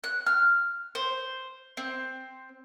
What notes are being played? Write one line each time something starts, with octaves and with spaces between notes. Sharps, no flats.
F#6
F6
C5
C4